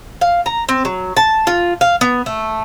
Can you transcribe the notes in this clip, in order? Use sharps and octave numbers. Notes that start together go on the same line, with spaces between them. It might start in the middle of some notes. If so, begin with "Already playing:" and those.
F5
A#5
C4
F#3
A5
F4
F5
B3
A3